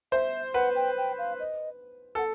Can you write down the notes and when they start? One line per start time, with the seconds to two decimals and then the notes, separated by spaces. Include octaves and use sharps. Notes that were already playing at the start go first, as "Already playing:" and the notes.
0.12 C5 E5
0.54 B4 F#5
0.76 G5
0.98 G5
1.18 F5
1.40 D#5
2.15 A4 F#5